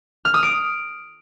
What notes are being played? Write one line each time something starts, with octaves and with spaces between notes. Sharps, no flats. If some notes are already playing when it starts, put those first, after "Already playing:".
F6
D#6
D7